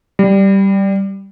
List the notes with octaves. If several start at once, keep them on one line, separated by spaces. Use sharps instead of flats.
G3